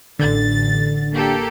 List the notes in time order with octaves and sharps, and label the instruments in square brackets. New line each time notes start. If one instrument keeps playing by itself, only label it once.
[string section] A1 A6 [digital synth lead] D3
[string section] A#3 G4 A4